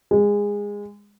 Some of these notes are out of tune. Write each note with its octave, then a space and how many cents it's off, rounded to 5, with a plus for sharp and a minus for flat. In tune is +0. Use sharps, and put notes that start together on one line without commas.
G#3 -20